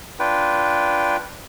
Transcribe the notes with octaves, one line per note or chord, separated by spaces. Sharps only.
D4 F4 B4 G5